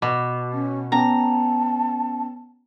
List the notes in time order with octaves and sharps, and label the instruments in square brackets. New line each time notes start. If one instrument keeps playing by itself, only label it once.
[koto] B2 [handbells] D6
[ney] C#4
[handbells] B3 C#4 G5 [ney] A5 [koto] A#5